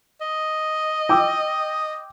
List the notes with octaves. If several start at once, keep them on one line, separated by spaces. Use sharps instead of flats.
D#5
G5 D6 E6